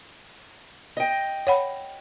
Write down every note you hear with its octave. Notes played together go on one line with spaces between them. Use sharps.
D#5 G5
C#5 F#5 B5